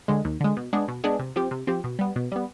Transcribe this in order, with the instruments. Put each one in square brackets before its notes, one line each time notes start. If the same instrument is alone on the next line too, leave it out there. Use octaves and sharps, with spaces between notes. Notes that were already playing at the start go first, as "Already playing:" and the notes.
[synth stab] D3 G#3
D#2
D3 G#3
B2
G#3 B3 D4 G#4
B2
G#3 B3 D4 G#4
C3
F3 C4 G4
C3
F3 C4 G4
B2
G3 B3
B2
G3 B3